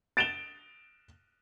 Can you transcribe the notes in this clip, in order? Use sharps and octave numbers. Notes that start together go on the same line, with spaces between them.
A6 D7 E7 F7 G7